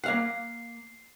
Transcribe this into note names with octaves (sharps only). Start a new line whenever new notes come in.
A#3 F5 F#5 C7